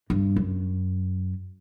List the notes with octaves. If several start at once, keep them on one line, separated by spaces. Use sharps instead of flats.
G2
F#2